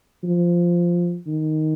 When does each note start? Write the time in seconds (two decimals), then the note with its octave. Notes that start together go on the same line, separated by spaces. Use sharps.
0.23 F3
1.27 D#3